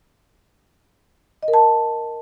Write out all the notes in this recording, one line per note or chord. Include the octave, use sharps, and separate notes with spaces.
D#5
A#4
A5